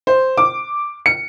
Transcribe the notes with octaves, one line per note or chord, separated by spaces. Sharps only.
C5
D6
C#7